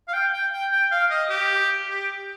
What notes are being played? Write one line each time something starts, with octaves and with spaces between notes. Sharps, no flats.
F5
G5
G5
G5
G5
F5
D#5
G4
G4